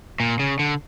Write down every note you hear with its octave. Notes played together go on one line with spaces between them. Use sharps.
A#2
C#3
D3